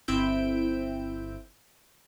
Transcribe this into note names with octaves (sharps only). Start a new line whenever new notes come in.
G1 C4 E4 E6 G6 D7